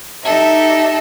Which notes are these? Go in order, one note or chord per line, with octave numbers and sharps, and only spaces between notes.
D#4 G4 A4 E5